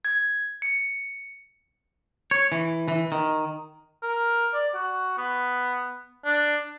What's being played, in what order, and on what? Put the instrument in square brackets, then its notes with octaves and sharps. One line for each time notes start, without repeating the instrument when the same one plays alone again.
[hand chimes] G#6
C#7
[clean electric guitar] C#5
E3
E3
D#3
[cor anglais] A#4
D5
F#4
B3
D4